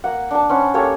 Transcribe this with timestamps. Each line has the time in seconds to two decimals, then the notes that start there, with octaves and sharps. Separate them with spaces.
0.04 A#3 F#5
0.31 D4 A5
0.49 C#4 C5 F#5 B5
0.74 A#3 G4 A4 C#5